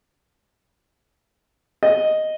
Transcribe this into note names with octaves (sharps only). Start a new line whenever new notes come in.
D#5